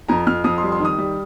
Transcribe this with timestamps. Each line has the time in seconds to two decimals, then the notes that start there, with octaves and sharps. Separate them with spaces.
0.09 F2 A#5
0.27 F2 F6
0.44 F2 D#6
0.58 C6
0.63 G3
0.72 C6
0.80 D#3 D#6
0.98 G3